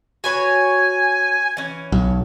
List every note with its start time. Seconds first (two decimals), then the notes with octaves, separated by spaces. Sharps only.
0.24 F#4 B4 C#5 G#5
1.57 E3 C#4
1.92 B1